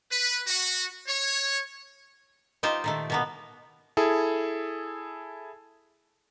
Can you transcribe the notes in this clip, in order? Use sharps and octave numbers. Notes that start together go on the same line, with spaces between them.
B4
F#4
C#5
D#4 F4 G4 C5
A#2 D#3 A3
B2 A#3 B3
E4 G#4 A4